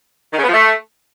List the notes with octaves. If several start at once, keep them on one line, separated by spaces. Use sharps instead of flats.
D#3
C#3
B3
F3
A3